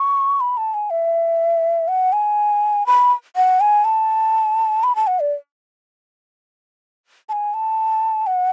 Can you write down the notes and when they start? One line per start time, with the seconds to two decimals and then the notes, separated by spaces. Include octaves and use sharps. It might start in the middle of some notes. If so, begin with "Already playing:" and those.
Already playing: C#6
0.40 B5
0.57 A5
0.74 G#5
0.90 E5
1.88 F#5
2.13 G#5
2.86 B5
3.36 F#5
3.61 G#5
3.85 A5
4.84 B5
4.96 A5
5.07 F#5
5.20 D5
7.29 A5
7.32 G#5
7.54 A5
8.27 F#5